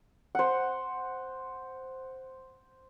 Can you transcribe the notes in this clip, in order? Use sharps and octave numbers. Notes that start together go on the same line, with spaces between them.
C5 F#5